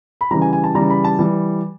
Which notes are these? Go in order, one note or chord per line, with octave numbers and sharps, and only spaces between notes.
B5
C#3 E3 G3 A#5
G#5
G#5
A5
C#3 E3 G3 A#5
B5
A5
E3 G3